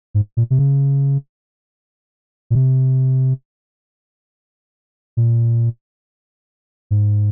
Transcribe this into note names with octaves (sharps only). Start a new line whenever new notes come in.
G#2
A#2
C3
C#3
A#2
C3
A#2
G#2